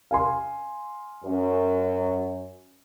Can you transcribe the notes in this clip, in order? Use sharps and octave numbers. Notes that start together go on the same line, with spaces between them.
F5 G#5 C6
F#2